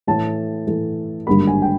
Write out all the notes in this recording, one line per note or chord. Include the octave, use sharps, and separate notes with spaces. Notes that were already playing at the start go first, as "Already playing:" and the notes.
A2 E3 A3 A5
A2 E3 A3
G#1 G2 D3 G3 A#3 B5
G#5
G5